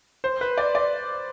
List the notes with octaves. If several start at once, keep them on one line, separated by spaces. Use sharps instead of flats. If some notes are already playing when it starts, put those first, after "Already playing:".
C5
B4
D5
D5